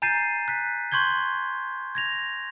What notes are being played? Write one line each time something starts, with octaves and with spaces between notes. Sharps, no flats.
G#5 A#5 G6 A6 C7 D#7
F#6 B6
C6 C#6 G6 G#6 G7
G#6 A#6 F7